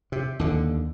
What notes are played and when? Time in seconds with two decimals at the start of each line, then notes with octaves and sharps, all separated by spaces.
0.12 C3
0.39 D#2 D3